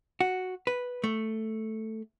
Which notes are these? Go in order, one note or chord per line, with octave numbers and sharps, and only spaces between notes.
F#4
B4
A3